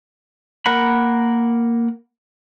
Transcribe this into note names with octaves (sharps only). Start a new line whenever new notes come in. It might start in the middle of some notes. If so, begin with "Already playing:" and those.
A#3 A#4 F#5 B5